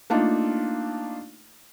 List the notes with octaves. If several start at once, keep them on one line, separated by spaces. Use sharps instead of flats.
A3 A#3 D4 D#4 F4